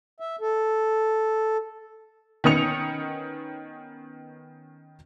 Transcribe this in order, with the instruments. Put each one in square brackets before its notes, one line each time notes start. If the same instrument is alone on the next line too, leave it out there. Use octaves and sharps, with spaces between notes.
[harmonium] E5
A4
[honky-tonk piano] D#3 B3 C#4 D#6 C#7 F7